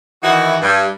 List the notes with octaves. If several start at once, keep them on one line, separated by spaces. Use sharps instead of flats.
D#3 E3 D#4 E4 F#4
G2